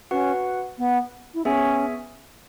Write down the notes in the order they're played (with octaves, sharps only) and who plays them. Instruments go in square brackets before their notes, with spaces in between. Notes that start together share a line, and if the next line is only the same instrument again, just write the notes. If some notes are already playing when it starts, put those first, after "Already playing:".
[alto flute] C#4 [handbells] F#4 B4 F#5
[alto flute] B3
E4
[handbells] B3 G#4 E5 G#5 [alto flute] C#4